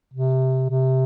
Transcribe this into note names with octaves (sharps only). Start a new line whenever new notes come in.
C3
C3